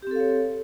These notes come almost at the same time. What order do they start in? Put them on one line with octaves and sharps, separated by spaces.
G4 C4 A4 F5 C#5